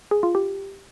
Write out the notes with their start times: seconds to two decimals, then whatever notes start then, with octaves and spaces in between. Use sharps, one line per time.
0.11 G#4
0.23 F4
0.35 G4